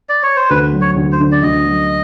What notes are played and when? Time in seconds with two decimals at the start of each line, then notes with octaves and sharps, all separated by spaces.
0.09 D5
0.23 C#5
0.36 C5
0.50 D2 B4
0.73 F#3
0.81 C#5
0.96 D2
1.12 C5
1.20 D3
1.32 D5
1.43 D2 D#5
1.67 F#3